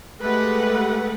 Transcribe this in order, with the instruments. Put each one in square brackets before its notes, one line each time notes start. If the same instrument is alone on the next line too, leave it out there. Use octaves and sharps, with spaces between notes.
[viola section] G#3 A3 G4 B4 F#5